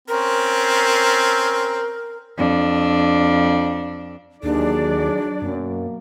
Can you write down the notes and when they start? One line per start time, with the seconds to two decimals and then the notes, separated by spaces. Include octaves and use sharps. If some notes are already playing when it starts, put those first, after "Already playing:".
0.08 C4 C#4 A#4
2.38 F2 D4
4.43 D#2 D3 F#3 D4 D#4 G#4 D5
5.42 F#2 B2 A#3